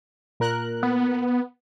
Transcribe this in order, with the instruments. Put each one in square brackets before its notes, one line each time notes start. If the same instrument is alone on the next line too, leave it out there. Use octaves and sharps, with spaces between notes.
[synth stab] A#2 A#4 F#6
[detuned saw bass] B3